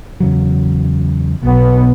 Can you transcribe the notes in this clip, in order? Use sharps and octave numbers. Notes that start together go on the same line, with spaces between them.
E2 C#3 F#3
B1 B3